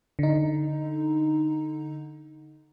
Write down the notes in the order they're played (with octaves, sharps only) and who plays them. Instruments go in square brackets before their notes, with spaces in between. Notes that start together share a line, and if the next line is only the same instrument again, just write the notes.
[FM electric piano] D3 D#4